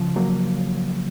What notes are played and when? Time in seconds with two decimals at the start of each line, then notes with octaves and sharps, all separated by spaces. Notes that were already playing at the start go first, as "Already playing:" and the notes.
Already playing: C#3 F3
0.16 F#3 A#3